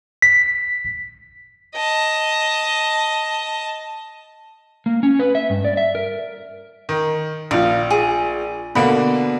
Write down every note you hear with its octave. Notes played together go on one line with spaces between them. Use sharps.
B6
D#5 A5
A#3
C#4
B4
E5
G2
D5
E5
A#4
D#3
A#1 F3 F5
G#4
B2 D3 A#3 B5